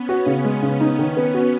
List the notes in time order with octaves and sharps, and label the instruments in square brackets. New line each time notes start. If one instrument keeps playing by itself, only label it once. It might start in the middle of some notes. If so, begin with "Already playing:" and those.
Already playing: [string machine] B3 C#4
[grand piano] F#4
C#3
G#3
C#3
D#4
D#3
B3
F#4